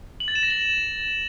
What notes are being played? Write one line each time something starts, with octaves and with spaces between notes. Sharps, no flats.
F#7
A6
E7
A#6
F#7